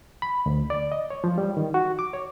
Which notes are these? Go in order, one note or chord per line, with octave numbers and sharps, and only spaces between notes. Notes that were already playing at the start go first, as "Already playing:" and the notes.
B5
D2
D5
D#5
C#5
F3
G3
D#3
F#4
D6
C#5